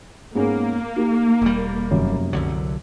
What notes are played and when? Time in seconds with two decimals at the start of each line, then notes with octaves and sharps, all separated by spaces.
0.35 G#2 A#3 B3 C#4
0.96 D#4 G4
1.42 E1 G3
1.91 F1 F#2
2.33 C2 D3 F#3